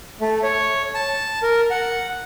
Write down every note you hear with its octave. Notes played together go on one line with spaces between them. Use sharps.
A3
C#5
A5
A#4
F#5